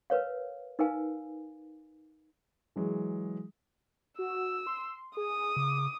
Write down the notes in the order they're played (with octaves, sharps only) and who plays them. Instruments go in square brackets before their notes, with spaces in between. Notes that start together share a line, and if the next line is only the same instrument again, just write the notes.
[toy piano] A#4 B4 C#5 F5
D#4 A#4 B4 F5 G#5
[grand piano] E3 F#3 G#3
[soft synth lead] F#4 [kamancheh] E6
[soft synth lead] C6
[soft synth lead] G#4 [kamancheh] D#6
[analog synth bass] C#3 [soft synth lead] D6